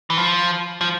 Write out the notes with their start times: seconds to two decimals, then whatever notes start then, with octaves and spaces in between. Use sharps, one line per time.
0.10 E3
0.18 F3
0.81 F3